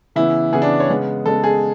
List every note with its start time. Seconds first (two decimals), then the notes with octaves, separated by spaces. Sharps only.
0.16 C#3 E3 B3 E4
0.52 C#3 E3 B3 G#4
0.62 D4
0.80 C#5
0.90 C#3 G#3 B3
1.26 C#3 G#3 B3 A4
1.44 G#4